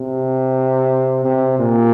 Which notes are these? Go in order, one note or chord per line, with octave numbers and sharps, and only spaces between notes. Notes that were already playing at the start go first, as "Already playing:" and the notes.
Already playing: C3
C3
A#2